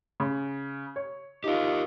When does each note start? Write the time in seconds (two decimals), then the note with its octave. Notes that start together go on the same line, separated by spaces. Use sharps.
0.20 C#3
0.96 C#5
1.44 D#4 F4 G4 A#4